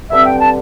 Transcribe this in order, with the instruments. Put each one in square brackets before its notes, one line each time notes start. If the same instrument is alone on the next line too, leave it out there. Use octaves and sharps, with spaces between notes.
[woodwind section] G2 D3 C4 E5
G5
A5